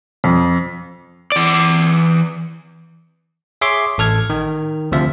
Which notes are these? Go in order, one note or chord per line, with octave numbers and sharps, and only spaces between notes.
F2
E3 D5
G#4 C#5 E5 C6 D6
A1 A4 F6 G#6
D#3
D2 C3 F3 E5